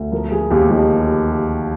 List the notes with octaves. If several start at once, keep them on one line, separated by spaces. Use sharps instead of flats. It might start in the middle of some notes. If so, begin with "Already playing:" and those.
Already playing: D2
F3 A#4
F3 G#4
D#2 G4
F3 D#4